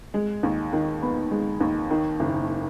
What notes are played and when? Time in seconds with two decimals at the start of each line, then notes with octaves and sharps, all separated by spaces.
0.14 G#3
0.43 D#2
0.73 D#3
1.02 B3
1.31 G#3
1.61 D#2
1.90 D#3
2.20 F#1